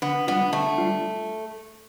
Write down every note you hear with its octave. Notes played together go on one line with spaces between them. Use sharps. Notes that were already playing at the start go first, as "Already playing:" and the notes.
D3 B3
G3 B3 D4 F4
D3 A3
G3 D4 F4